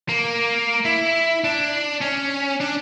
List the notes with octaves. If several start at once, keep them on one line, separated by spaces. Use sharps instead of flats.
A#3
E4
D4
C#4
D4